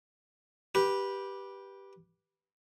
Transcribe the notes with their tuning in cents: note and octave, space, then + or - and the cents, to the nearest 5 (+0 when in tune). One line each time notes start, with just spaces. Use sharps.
G4 +0 B4 -15